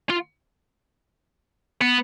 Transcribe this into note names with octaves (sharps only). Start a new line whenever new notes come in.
F4
B3